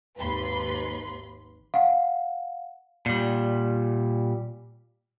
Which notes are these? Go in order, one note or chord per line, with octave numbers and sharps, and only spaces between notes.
G#1 D#2 B4 B5 C6
F5 F#5
A#2 G3